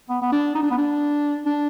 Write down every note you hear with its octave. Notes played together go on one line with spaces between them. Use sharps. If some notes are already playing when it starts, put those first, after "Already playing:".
B3
B3
D4
D#4
D4
B3
D4
D4